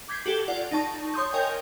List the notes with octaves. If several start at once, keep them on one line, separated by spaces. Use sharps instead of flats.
D6 G6 G#6 B6 C7
F#4 G4 A4
F4 D5 F#5
D#4 D5 A5 C#6
C#5 C6 D#6 G6
A#4 C#5 D#5 G5 G#5